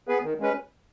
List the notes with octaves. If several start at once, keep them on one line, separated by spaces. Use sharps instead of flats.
B3 G#4 B4
D#3
G#3 C#4 B4